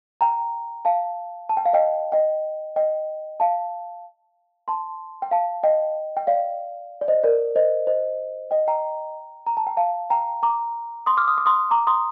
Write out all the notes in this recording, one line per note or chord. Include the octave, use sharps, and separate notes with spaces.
G5 A#5
F5 A5
A5
G5
F5
D#5 G5
D#5 G5
D#5 G5
F5 A5
A5 C6
G5
F5 A5
D#5 G5
G5
D5 F5
D5
C5 D#5
A#4 D5
C5 D#5
C5 D#5
D#5 G5
G5 A#5
A#5
A5
G5
F5 A5
G5 A#5
A#5 D6
C6 D#6
D6 F6
D#6
D6
C6 D#6
A#5 D6
C6 D#6